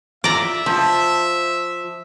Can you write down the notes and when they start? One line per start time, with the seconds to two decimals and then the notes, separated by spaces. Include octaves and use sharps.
0.24 E4 F4 D5 E5 A#5
0.66 F3 F4 C5 A5